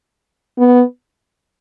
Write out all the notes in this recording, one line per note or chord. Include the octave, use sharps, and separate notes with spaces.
B3